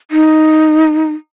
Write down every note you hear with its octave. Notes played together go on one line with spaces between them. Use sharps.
D#4